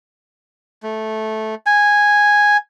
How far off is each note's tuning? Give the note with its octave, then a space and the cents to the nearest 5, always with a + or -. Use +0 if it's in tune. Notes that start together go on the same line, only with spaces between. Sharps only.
A3 -10
G#5 -5